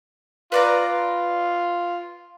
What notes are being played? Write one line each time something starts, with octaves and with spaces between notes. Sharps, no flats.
F4 B4 D5 A#5